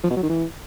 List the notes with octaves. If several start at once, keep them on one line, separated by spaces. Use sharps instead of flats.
F3
B2
F#3
D#3
E3